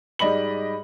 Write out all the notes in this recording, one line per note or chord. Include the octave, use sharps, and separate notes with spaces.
G#2 G3 D5 D#5 B5 F#7